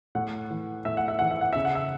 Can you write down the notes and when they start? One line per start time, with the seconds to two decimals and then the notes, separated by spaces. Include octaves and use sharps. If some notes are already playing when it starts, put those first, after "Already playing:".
0.15 A2 F#5
0.50 E3
0.85 A2 E5
0.97 F#5
1.08 E5
1.19 E3 F#5
1.31 E5
1.41 F#5
1.53 C#3 E5
1.65 F#5
1.75 E5